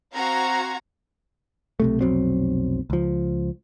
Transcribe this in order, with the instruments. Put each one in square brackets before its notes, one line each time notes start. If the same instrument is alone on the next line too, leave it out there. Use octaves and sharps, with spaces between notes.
[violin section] C4 F#4 F5 A#5 G#6
[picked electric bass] B1 C3 A3
F1 B1 F#3 C4
C#2 F3